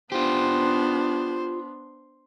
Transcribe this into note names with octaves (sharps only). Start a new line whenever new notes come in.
B3 D4 F4 G4 C5